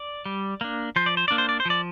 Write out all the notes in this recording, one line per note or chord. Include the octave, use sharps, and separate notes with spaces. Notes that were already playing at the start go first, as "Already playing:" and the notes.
Already playing: D5
G3
A#3 D4
F3 C5
D5
C5
A#3 D4 D5
C5
D5
C5
F3 D5